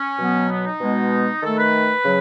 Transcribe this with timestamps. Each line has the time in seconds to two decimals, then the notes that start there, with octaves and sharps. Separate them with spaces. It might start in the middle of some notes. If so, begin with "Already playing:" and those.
Already playing: C#4
0.19 B2 F#3 B3
0.49 B3
0.65 D#4
0.81 B2 G#3 B3
1.43 D#3 A3 A4
1.58 B4
2.04 C#3 F#3